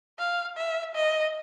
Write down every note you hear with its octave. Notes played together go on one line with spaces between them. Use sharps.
F5
E5
D#5